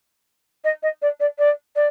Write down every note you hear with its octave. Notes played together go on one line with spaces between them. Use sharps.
D#5
D#5
D5
D5
D5
D5